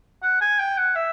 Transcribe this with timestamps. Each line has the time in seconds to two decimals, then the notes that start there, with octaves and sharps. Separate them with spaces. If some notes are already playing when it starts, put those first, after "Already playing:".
0.22 F#5
0.41 G#5
0.59 G5
0.77 F#5
0.95 E5